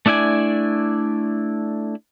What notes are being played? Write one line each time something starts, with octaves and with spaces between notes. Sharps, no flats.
A3 D4 E4 D5 G#5